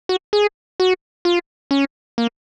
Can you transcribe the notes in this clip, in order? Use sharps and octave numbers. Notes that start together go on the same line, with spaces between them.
F#4
G#4
F#4
F4
C#4
A#3